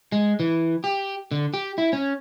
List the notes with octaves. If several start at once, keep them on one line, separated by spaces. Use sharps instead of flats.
G#3
E3
G4
D3
G4
E4
C#4